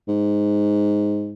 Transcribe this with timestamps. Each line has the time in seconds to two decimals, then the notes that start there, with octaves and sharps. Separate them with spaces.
0.08 G#2